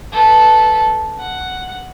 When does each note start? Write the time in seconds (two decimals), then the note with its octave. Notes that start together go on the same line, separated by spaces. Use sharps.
0.12 A4 B4
1.20 F#5